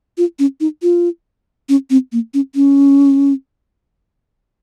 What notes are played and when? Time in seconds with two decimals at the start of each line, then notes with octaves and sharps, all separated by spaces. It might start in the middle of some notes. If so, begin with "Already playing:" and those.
0.18 F4
0.39 C#4
0.60 D#4
0.83 F4
1.69 C#4
1.90 C4
2.12 A#3
2.34 C#4
2.55 C#4